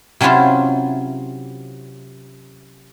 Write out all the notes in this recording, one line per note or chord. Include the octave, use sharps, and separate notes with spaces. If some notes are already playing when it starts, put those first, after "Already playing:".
C3 F#3 C#4 E4 F4 C5